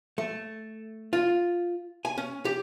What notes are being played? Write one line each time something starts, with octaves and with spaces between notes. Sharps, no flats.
A3
F4
G#5
C#4
G4